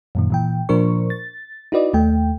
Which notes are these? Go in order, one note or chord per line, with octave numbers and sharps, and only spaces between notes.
F#2 A#2 D#3
A#2 E3 G5
A#2 F3 D4 A#4 C5 C#6
A6
D#4 E4 F#4 B4 D5 D#5
D#2 A3 G5